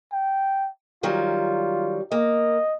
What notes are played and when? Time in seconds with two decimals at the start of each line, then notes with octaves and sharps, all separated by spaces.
0.12 G5
1.03 D#3 F#3 G3 F4
2.12 A#3 D#5